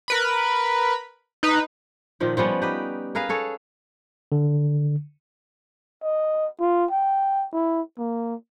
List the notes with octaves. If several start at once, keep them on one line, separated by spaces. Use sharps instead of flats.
A#4 B4 B5
D#4 B4
A#2 D#3 F3 D#4
F3 G3 B3 C#4
D#4 G4 B4
G#4 A#4 B4 F5
G#4 A4 C#5
D3
D#5
F4
G5
E4
A#3